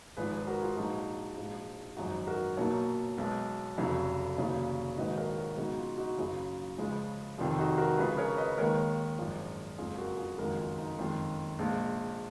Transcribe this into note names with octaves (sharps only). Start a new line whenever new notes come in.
G#1 G#2 F3 G#4 B4
G#4 B4
F#4 A#4
F4 G#4
A#1 G#2 F#3 D#4 F#4
A#1 G#2 F3 G#3
G#1 F#2 F3 D#4 F#4
F#4 A#4
B1 A#2 F#3 A#4 C#5
B1 B2 G#3
F1 F2 C#3 F#3
F1 D#2 C#3 F#3
A#1 G#2 D#3 F#3 B4 D#5
A#4 C#5
F#4 A#4
C#2 B2 F#3 D#4 F#4
F4
D#4 F#4
F#1 F#2 C#3 F#3 F4 G#4
C#2 C#3 F3 G#3
F1 F2 D#3 F4
D#4 F#4
F#4 A#4
C#2 C#3 F3 G#4 B4
A#4 C#5
B4 D#5
D#2 D#3 G#3 A#4 C#5
G#1 F#2 F3 G#3
F#1 F2 F3 G#3 F4 G#4
F#4 A#4
F4 G#4
F#1 F2 D#3 G#3 F#4 A#4
F4 G#4
D#4
F#1 F2 D#3 G#3 F4
A#1 A#2 G#3